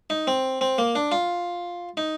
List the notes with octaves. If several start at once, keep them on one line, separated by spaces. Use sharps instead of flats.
D#4
C4
C4
A#3
D4
F4
D#4